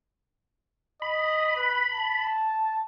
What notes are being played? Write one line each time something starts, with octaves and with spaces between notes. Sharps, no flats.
D#5 B5
B4
A5